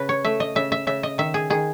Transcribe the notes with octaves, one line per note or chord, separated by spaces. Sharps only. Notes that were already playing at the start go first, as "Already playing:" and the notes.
Already playing: C#3 B4
C#5
A3 E5
D#5
C#3 E5
E5
C#3 E5
D#5
D#3 E5
G#4
D#3 G#4